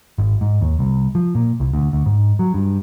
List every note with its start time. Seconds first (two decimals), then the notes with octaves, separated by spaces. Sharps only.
0.18 G#1
0.41 G#2
0.61 D#2
0.79 C2
1.15 F3
1.35 A#2
1.60 C2
1.73 D2
1.93 D2
2.06 G#2
2.39 F#3
2.54 G2